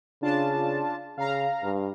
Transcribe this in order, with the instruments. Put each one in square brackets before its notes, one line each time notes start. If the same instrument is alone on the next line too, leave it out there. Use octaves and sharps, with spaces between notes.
[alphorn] C#3 [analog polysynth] D4 F4 A5
[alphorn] C#3 [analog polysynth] F5 A#5
[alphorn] G2